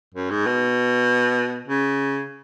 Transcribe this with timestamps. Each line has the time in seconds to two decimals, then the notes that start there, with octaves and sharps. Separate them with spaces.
0.14 F#2
0.30 G#2
0.46 B2
1.68 C#3